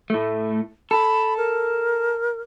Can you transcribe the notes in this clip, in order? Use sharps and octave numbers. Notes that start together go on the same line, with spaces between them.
A2 A3
A4 B5
A#4